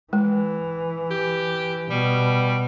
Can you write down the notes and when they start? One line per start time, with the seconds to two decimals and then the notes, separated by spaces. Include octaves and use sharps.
0.13 E3 G#3
1.11 G4
1.90 B2 G3